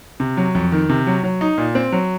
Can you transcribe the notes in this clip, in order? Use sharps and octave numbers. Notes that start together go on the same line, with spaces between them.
C3
F#3
F2
D#3
C3
F#3
F#3
D#4
A#2
C4
F#3